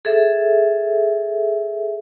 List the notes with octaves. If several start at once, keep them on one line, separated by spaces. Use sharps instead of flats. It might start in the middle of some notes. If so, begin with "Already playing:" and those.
G#4 A4 E5